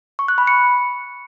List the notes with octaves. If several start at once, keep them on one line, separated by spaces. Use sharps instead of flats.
C#6
F#6
B5
C#7